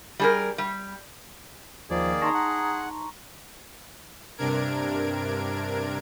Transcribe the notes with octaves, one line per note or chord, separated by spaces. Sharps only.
G3 G#4 A#4
G3
D#2 D#3 F3 A#3 G#4 D5
D#4 A5 A#5 C6 C#6 A#6
F#5
G2 C3 D4 A#4 G#6 D7